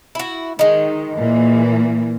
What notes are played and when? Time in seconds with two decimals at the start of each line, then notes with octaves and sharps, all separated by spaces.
0.15 E4 F#4
0.59 D#3 G#3 D#4
1.17 A#2 E3 A#3